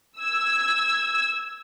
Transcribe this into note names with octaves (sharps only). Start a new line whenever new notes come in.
E6 G#6